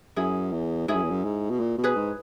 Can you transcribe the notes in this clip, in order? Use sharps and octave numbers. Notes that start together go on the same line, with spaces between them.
F#2 E4 G#4
E2
G#2 E4 G#4
F#2
E2
F#2
G#2
B2
A#2
B2
G#4 B4
G#2